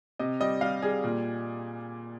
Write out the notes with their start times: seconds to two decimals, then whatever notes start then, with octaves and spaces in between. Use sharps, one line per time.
0.19 C3 D#5
0.40 G3 D#5
0.61 G3 F5
0.82 G3 G#4
1.04 A#2